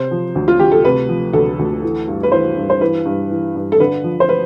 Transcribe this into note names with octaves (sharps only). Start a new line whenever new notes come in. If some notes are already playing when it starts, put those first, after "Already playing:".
Already playing: C3 C5
F3
D2
F4
D2 G4
A4
C3 B4
F3
D2 A4
D2
E3
G2
B4
E3 C5
G2
C5
E3 B4
G2
E3
G2
A4
D3 B4
F3
C5
B4